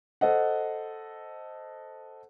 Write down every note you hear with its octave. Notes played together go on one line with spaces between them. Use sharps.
A4 C5 D#5 F#5